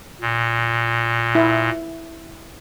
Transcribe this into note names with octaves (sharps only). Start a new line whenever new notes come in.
A#2
E4